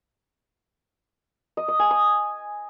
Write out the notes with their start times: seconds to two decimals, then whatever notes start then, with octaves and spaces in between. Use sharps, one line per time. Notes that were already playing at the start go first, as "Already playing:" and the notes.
1.57 D#5
1.68 D#5
1.79 G#5
1.91 D#6